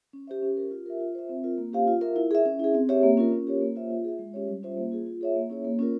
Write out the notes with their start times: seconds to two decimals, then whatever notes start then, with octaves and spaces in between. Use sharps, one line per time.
0.13 C#4
0.27 G4 C5 E5
0.42 C#4
0.57 G4 A#4
0.71 F4
0.86 A#4 E5
1.00 F4
1.15 C5 E5
1.29 C4
1.44 F4 A#4
1.58 A#3
1.73 C#4 G4 C5 F5
1.87 F4
2.01 A#4 E5
2.16 E4
2.31 G#4 E5
2.46 C#4
2.59 E4 G#4
2.74 C4
2.89 G4 C#5 E5
3.03 A#3
3.17 C#4 F4 A#4
3.32 C#4
3.47 G4 A#4 C#5
3.61 A#3
3.76 F4 C5 E5
3.91 F4
4.04 G#4 E5
4.19 G#3
4.34 C#4 G4 C#5
4.48 G3
4.63 C#4 F4 C5 E5
4.77 A#3
4.92 F4 G#4
5.06 F4
5.21 G#4 C#5 E5
5.36 A#3
5.50 C#4 E4 G#4 C#5
5.65 A#3
5.79 C#4 F4 A#4